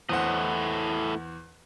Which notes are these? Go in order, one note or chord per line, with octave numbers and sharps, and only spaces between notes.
E2 A2 C5 D#5 F#5